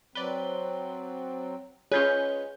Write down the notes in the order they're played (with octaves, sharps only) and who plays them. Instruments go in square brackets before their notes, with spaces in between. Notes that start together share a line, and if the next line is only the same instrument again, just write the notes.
[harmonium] F#3 C4 [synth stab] B4 D5 [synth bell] G7
[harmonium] G#3 [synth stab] C#4 F4 B4 [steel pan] G#4 [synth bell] C#5 G6 G7